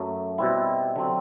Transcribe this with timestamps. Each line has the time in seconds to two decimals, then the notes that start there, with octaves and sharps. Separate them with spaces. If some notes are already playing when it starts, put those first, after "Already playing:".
Already playing: F#2 F#3 A3
0.38 B2 G3 C4 E4
0.96 D3 F#3 C4